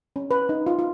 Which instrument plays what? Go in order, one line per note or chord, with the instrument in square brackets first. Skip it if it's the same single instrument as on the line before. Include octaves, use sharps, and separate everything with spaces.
[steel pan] C#4
B4
D#4
F4
F4